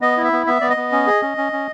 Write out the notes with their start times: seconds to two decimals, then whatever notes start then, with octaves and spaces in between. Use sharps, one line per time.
0.01 B3 D#5
0.17 E4
0.24 E5
0.32 B3
0.47 B3 E5
0.61 B3 D5
0.70 D#5
0.77 B3
0.92 C#4
1.07 G#4
1.22 C#4
1.38 C#4
1.52 C#4